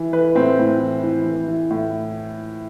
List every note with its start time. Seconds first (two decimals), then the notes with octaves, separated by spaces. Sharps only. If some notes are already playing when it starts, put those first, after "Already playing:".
Already playing: E3
0.13 E3 B4
0.35 A2 C4
0.59 A2
0.80 E3
1.03 E3
1.25 E3
1.48 E3
1.70 A2